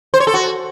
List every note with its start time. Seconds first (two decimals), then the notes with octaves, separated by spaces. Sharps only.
0.14 C5
0.20 C#5
0.27 A4
0.34 F#4